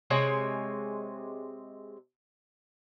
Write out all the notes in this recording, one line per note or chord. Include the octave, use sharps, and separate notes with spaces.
C3 G#3 C#5 G#5